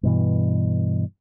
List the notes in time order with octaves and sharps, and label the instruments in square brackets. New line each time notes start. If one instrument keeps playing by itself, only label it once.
[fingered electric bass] G2 B2 E3